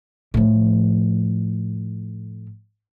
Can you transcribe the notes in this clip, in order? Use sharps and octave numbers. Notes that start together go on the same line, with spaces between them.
A2 F3